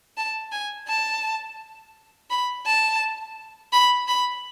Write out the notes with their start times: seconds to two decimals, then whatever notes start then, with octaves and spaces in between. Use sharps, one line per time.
0.17 A5
0.52 G#5
0.88 A5
2.30 B5
2.66 A5
3.73 B5
4.08 B5